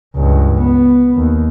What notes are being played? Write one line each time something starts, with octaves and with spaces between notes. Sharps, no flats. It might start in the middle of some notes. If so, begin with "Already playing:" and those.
C#2 G2
B3
D#2